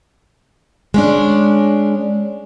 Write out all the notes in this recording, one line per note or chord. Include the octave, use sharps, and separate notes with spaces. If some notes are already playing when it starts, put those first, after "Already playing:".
G#3 C#4 D4